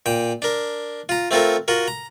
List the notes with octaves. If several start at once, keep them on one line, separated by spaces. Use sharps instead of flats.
A#2 G5
D4 A#4
F4 A#5
A3 C4 F4 A4 A#4
F4 F#4 A#4
A#5